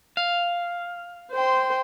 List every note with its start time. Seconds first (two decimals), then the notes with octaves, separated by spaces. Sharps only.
0.17 F5
1.33 C5 G5 C6